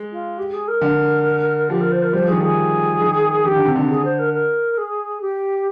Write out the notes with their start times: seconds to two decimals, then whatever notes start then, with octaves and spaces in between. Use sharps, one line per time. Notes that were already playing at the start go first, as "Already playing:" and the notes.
Already playing: G#3
0.11 F4
0.38 G4
0.53 G#4
0.68 A#4
0.81 D3
1.69 F3 G4
1.80 A#4
1.91 C5
2.02 A#4
2.13 G3 C5
2.22 F3
2.28 D#3 G#4
2.40 F3 G#4
3.02 D#3
3.45 D#3 G4
3.56 D3
3.65 C3
3.76 D3
3.89 G#4
4.04 C5
4.18 A#4
4.33 A#4
4.77 G#4
5.21 G4